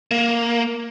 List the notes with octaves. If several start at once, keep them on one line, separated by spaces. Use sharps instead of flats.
A#3